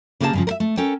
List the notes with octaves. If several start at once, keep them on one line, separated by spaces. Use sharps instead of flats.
C#3 A#3 G4 G#4 E5 A5
G2 C#3 F3
A#4 E5
A3
C#4 A4 A#4 C#5 G5